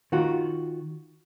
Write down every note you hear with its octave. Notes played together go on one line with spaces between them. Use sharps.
D#3 F4 F#4